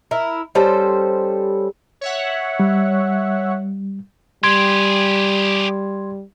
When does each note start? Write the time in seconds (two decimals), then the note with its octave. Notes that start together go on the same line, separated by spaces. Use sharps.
0.11 E4 A#4
0.55 G3 C#4 A4 C5
2.01 C#5 E5 F#5
2.60 G3
4.44 G3 G4 G#4 C6 G#6